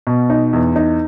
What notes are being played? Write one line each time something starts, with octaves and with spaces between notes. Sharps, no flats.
B2
D#4
E2
D#4